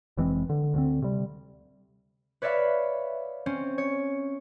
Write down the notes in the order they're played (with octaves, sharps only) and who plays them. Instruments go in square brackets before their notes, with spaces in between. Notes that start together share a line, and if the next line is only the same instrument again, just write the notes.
[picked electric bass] F1 E3 G#3 C4
D3
D2 D3 C4
C3 G3
[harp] B4 C#5 D5 E5 F5 B5
C4 C#4
C#5